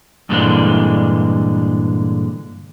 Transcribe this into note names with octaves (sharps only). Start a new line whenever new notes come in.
G2 A#2 D3 E3 G#3